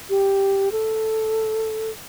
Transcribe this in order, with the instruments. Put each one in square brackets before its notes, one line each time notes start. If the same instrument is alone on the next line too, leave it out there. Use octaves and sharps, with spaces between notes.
[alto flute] G4
A4